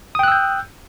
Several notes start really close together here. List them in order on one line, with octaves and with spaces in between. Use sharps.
D#6 G5 F#6 E6 G6